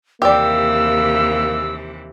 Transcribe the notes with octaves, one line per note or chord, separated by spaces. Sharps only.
D#2 C3 E3 A#3 G4 D5 E6